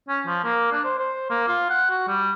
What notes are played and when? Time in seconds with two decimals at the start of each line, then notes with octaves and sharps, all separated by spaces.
0.09 C#4
0.27 F3
0.44 A#3
0.72 D4
0.84 C5
0.99 C5
1.30 A#3
1.48 F4
1.70 F#5
1.90 F#4
2.08 G3